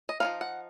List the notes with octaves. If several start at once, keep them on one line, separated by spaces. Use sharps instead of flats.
D#5
F3 C4 D#4 F5
F#5